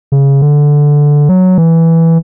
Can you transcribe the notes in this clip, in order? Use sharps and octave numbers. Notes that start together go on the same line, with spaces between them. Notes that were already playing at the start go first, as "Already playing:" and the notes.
C#3
D3
F#3
E3